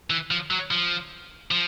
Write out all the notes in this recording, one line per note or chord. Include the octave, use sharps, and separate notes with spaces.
E3
F3
F#3
F3
F3